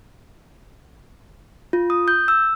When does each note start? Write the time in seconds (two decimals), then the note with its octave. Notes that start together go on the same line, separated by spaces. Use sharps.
1.73 F4
1.90 D#6
2.08 G6
2.28 E6